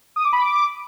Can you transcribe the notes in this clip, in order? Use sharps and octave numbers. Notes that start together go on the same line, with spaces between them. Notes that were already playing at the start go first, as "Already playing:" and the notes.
D#6
D6
B5
D6